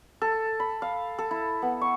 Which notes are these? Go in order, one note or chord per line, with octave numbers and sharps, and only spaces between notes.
A4
B5
F5
A4
E4
B3
C#6